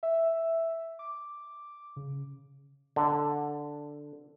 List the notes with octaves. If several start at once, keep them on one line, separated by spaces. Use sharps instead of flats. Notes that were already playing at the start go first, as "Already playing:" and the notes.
E5
D6
C#3
D3